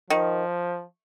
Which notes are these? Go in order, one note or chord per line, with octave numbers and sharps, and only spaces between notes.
D#3 F3